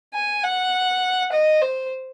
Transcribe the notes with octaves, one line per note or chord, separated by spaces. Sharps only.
G#5
F#5
D#5
C5